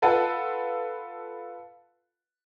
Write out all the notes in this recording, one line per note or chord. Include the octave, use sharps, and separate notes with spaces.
F4 A4 B4 F#5 A5